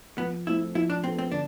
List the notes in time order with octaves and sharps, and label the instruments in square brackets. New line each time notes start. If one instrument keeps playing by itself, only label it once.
[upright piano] F3 [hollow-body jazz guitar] B3
[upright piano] A3 C4 [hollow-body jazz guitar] E4
[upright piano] F3 [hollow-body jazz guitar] E4
[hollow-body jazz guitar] D4
[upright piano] B3 D4 A4 [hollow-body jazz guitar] C4
[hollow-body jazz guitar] C4
[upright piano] D3 [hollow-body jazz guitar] D4